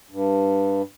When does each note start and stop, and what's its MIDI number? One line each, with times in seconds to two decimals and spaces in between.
0.11 0.82 43